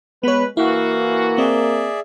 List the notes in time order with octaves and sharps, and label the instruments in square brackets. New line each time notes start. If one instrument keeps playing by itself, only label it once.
[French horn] G#3 [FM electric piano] B3 C#5 [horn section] B4
[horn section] E3 F#4 [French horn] A#3 [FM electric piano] E4 [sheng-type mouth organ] F5
[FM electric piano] C4 [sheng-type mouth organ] G#4 D5 E5